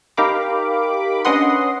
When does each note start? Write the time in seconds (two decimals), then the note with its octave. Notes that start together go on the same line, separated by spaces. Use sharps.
0.17 D#4 G4 A#4 F5 B5 D6
1.25 C#4 D4 B4 D#5 F#5 C6